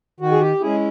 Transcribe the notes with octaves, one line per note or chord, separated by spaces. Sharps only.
D#3 F#4
G#4
G4
G#3 C#4 E4 G#4